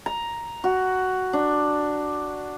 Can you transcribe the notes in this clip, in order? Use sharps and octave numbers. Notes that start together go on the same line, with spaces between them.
A#5
F#4
D4